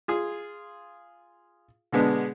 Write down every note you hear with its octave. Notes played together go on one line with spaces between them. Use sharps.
F4 G#4
B2 D3 G#3 B3 D4